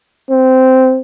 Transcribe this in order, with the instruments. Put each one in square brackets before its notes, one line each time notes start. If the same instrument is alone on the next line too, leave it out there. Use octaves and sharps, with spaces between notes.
[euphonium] C4